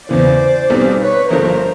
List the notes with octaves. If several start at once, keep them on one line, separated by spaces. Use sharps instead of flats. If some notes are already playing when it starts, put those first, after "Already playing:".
E2 C#3 E3 C5 D5
B1 B2 G3 C4
B4 C#5
G1 G2 D3 F3 A#4 C5